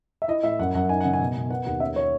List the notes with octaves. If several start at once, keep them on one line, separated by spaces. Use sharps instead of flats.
E5
E4 D#5
A2 E5
F#2 F#5
F#2 F#5
D#4 G#5
C#3 F#5
G#5
B2
B2
B3 F#5
D#2 F#5
C#4 E5
C#5